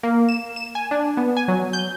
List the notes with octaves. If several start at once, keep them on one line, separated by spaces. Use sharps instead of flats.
A#3
E7
E7
G#5
D4
B3
G#5
F#3
G6